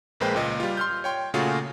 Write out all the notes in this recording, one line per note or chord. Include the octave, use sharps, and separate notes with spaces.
A#1 G#3 A#3 B4 C5 G5
C#2 A#2 D#5
G3 F4
C6 F6 G6
C#5 G5 C6
A#2 C#3 A3 F4 F#4 G#4